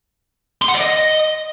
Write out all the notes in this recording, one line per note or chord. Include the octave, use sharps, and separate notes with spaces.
C6
F#5
D5
D#5